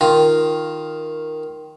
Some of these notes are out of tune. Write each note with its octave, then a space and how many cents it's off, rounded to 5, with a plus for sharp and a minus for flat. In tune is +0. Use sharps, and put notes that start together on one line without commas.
D#3 +0 F4 +0